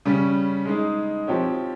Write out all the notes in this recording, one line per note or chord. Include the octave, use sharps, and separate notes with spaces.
C#3 G3 C#4
G#3 D#4 G#4
F3 C4 G4 C#5